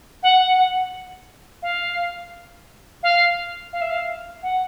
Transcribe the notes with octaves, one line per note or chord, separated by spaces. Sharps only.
F#5
F5
F5
F5
E5
F5
F#5